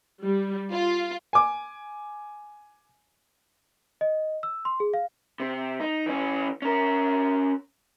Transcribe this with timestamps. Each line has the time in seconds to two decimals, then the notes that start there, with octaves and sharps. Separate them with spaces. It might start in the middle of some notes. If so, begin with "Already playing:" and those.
0.23 G3
0.72 F4
1.33 G#5 D6
4.01 D#5
4.43 E6
4.65 C6
4.80 G#4
4.94 F5
5.40 C3
5.80 D#4
6.06 E3 C#4
6.62 C#4 A#4